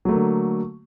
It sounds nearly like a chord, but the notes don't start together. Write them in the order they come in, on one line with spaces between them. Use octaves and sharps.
F#3 A3 A#3 D3